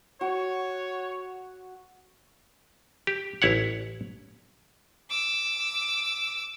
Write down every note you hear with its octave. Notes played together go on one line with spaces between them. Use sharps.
F#4 C#5
G4
A1 E4 C#5 F#5
D6 E6